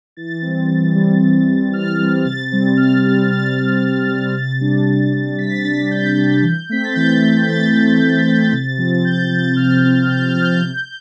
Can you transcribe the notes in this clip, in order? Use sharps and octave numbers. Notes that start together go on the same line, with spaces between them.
E3 A6
G3 C4
E3
G3 C4
E3
G3 C4
E3 F6
G3 C4
C3 A6
G3 C4
C3 F6
G3 C4
C3 A6
G3 C4
C3
G3 C4
C3 A6
G3 D4
C3
G3 D4
C3 B6
A6
G3 D4 B6
C3 G6
G3 D4
E3
A3 C4 B6
A6
E3 G6
A3 C4
E3 A6
A3 C4
E3
A3 C4
C3
F3 C4
C3 G6
F3 C4 A6
C3 F6
F3 C4
C3 G6
F6
F3 C4
G6
C3